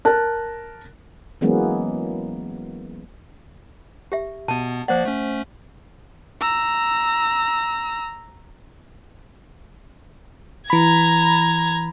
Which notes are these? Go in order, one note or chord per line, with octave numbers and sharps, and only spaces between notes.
A#4 A5 F#6
E3 F#3 G#3 A#3 B3 C#4
G4 E5
B2 B3 A5
F3 A#3 C5 D5 F#5
A3 C#4
A#5 E6
E3 A#5 B5 G#6